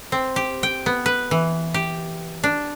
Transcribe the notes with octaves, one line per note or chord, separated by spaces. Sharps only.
C4
G4
G5
B3
B4
E3
G4
D4